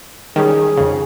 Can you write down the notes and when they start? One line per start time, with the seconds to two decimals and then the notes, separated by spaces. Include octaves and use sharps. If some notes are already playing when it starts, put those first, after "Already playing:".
0.36 D#3 G3 C#4 G#4
0.77 F2 C#3